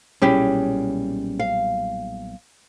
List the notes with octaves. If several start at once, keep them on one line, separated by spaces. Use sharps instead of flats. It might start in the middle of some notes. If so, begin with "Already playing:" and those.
B1 A#2 G3 C#4 E4 G4 G#4
F5